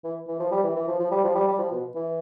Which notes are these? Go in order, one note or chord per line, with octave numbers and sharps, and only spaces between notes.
E3
E3
F3
G3
E3
E3
F3
F3
G3
F3
G3
G3
F3
B2
E3